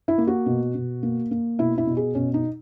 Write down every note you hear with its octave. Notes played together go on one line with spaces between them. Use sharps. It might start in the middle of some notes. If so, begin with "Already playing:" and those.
E4
A#3
F#4
B2
B2
A#3
A#3
B2 E4
E4
B2
G#4
B2 C#4
D#4